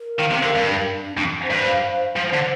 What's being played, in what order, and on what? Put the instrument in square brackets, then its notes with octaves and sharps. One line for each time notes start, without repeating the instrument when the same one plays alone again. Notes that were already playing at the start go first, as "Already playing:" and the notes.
Already playing: [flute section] A#4
[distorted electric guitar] D#3 [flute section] F5
[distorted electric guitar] C3
[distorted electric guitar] D3 [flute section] A#4
[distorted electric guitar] G2
[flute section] D4
D4
[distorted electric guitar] F2 [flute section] D4
[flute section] C5
[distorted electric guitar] G2
[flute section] F5
F5
[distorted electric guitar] F3 [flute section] C5
[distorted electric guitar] D3